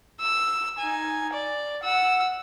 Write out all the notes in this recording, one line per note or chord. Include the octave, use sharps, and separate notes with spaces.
E6
D#4 G#5
D5
F#5 E6